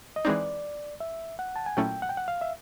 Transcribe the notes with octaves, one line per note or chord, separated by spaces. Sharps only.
D#5
E3 G#3 C4 D#4 D5
E5
F#5
A5
G#5
A#2 F#3 A3 C#4 E4 G5
F#5
G5
F#5
F5
E5